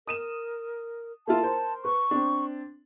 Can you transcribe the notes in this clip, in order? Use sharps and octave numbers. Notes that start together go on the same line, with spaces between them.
A#4 D#6 D#7 E7
A#3 E4 F4 A5
A#4 C5
B4 C#6
C4 D4